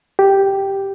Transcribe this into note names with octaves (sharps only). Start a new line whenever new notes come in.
G4